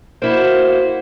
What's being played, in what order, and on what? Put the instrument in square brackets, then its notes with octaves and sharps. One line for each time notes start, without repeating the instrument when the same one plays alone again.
[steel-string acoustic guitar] A#3 E4 F#4 [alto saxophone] C5